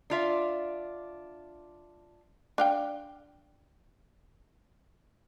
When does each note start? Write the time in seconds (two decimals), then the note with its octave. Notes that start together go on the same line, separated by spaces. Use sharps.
0.10 D4 F4 E5
2.58 D4 F5 G5